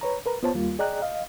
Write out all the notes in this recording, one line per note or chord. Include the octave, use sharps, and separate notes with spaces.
B4 C#5 A#5
A#4 B4 A#5
B3 F4 C5 C#5 A5
D#2 G3 A#3 F4
G#4 D5 D#5 G5 A#5 F#6
D#5 F5